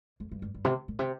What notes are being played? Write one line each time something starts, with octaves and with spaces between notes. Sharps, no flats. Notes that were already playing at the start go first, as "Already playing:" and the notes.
F2
G2
G2
G2
C3
A#2
C3